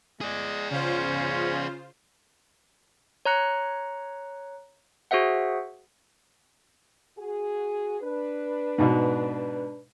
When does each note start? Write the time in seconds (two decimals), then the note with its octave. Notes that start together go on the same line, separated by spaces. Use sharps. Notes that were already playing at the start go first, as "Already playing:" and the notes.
0.21 G#3 G#4 D5
0.71 C#3 C#4 F4 C5
3.25 C#5 A#5 F#6 C#7
5.11 F#4 G#4 C5 E5 F#5
7.17 F#4 G#4
8.01 D4 B4
8.78 G#2 B2